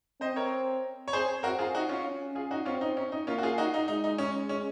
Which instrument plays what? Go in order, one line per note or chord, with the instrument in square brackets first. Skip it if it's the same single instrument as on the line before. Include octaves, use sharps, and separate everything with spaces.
[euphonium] C4 [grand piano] C5 D#5
[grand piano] A#4 C#5
C#5
[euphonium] C4 [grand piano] G#4 C5
[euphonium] C4 [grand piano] F#4 A#4
[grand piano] F4 G#4
D#4 F#4
C#4 F4
[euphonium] C#4
[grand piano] F4 G#4
D#4 F#4
[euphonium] C4 [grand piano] C#4 F4
[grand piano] D#4
C#4
D#4
[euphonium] A#3 [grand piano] C#4 F4
[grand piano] F#4
F4 G#4
D#4 F#4
D#4
[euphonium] G#3 [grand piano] D#4
[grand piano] D#4
C#4
C#4